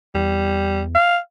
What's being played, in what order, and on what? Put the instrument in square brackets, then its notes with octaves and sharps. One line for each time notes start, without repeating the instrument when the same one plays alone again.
[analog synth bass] E2 [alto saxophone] G3
[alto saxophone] F5